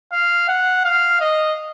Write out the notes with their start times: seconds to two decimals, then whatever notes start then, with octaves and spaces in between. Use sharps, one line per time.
0.13 F5
0.49 F#5
0.85 F5
1.20 D#5